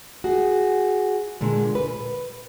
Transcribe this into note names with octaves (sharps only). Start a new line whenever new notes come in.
F#4 G#4
A#2 D3 G#3
B4